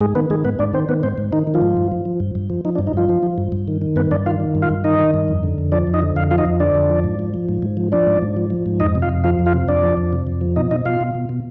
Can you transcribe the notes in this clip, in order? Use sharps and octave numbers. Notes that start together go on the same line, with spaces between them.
G#2 G#3 G#4
D#3 B3 B4
D#3 G#3 G#4
G#2 B3 B4
G#2 D4 D5
D#3 C4 C5
D#3 B3 B4
G#2 C4 C5
G#2
D#3 D#4
D#3
F3 F4
G#2
G2
F3
F3
G2
G2
F3
F3 D#4
D4
G2
D#4
G2 F3 F4
F3
F3
G2
G2
D#3
D#3
G2 B3 B4
G2 D4 D5
D#3 F4 F5
D#3
G2
F4 F5
G2
D#3 D#4 D#5
D#3
G2
F2
D3
F2
F3 D4 D5
F2
D#4 D#5
D3
F2 F5
F3 F4 F5
D#4 D#5
F2
D3 D4 D5
F2
F3
G#2
F3
F3
G#2
G#2
F3
F3 D4 D5
G#2
G#2
F3
F3
G#2
F2 D#4 D#5
C3
F4 F5
F2
F3 F4 F5
F2
F4 F5
C3
F2 D4 D5
F3
F2
C3
F2
F3
B2 D#4 D#5
B2 D#4 D#5
B2 F4 F5
B2
B2
B2